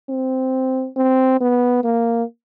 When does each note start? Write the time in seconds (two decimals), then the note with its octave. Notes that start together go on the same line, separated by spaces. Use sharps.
0.09 C4
0.97 C4
1.41 B3
1.84 A#3